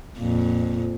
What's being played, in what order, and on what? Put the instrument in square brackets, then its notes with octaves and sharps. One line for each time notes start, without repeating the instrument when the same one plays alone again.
[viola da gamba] F2 A#2